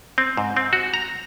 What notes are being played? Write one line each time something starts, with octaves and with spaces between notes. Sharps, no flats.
C4
G#2
C4
F#4
A#5